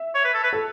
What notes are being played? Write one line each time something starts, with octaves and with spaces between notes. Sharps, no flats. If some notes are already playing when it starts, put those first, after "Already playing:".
Already playing: E5
C#5
B4
A4
B4
A4